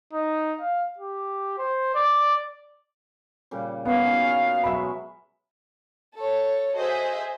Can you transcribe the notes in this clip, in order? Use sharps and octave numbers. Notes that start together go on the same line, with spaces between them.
D#4
F5
G4
C5
D5
A#2 C#3 G3
B3 D#4 C#5 F5
C#4 D#4 F#4
B2 F#3 G#3 E5 B5
A4 C#5
F#4 G#4 C5 D#5 E5